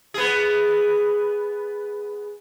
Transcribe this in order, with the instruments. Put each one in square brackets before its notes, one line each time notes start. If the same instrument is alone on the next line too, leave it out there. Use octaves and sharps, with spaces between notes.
[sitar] B3 G#4